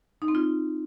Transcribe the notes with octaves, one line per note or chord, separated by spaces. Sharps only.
D#4
C4
F4